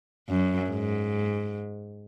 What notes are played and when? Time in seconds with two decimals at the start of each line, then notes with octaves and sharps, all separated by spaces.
0.29 F#2
0.70 G#2